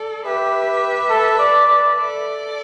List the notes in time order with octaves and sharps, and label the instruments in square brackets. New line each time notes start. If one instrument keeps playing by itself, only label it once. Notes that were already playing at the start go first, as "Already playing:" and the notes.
Already playing: [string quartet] A4 D5
[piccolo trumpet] G4 [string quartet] B4 E5
[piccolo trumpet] A4
D5
D5
[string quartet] A4 D5